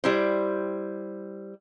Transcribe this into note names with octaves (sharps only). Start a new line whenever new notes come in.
G3 E4 C5